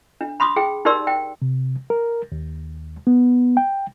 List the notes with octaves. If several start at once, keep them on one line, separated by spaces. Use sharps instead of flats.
D4
B5 C6 D6 D#6
G#4 G5
D#4 G4 A#4 D5 C6 E6
G5
C3
A#4
D#2
B3
G5